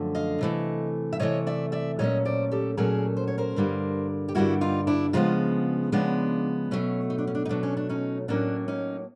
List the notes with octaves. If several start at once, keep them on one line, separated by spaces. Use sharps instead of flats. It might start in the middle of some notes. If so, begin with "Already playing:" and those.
Already playing: F#2 D3 F3 A3
D#5 F5
C3 E3 A3
E5
C3 E3 A3 C#5 D#5
D5 E5
D5 E5
A#2 F#3 A3 C#4 C#5 D#5
C5 D5
G4 A4
A#2 F#3 A3 C#4 G#4 A#4
C5
C#5
A#4 C5
G2 D3 G3 A#3
G4
G2 D3 G3 A#3 E4 F#4
D#4 F4
D4 E4
C#3 F3 G#3 B3 D#4 F4
C#3 F3 G#3 B3 D4
B2 F#3 A3 C#4
D#4
D4
C#4
D4
D#4
B2 F#3 A3 D4
C#4
D4
C#4 D#4
A2 F#3 A#3 C#4 D4
C#4 D#4